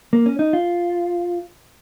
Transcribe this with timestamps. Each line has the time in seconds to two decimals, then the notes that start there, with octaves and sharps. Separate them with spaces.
0.13 A#3
0.26 C#4
0.39 D#4
0.53 F4